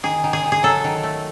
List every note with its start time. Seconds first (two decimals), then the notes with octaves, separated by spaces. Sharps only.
0.03 D#3 G#4
0.23 D#3
0.33 G#4
0.44 D#3
0.52 G#4
0.63 F#3 A4
0.84 D#3
1.03 A3